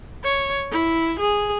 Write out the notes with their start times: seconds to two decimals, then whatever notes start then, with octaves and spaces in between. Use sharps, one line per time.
0.24 C#5
0.71 E4
1.19 G#4